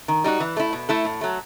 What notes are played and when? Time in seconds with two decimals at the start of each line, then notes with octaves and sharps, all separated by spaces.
0.08 D#3
0.24 G3 D#4 F#4
0.40 E3
0.57 A3 E4
0.73 B2
0.89 A3 E4 A4
1.05 A2
1.21 F#3 A3